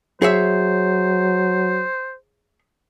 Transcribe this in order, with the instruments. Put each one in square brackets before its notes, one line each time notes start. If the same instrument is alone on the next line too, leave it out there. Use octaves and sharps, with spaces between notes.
[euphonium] F#3 [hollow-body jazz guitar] G#4 C#5 E5 [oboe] C5